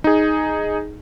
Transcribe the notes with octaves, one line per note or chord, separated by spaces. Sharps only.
D#4 G#4